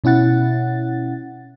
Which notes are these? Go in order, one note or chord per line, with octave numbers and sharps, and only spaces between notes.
B2 C#4 E4 F#5 A6